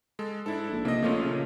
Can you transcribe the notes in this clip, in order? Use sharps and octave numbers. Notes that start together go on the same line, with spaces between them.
G#3 A4
G#2 D4 E4 A4
A#1
C3 A#3 D#5
A#2 F3 A3 A#3 C#4 F4
C#3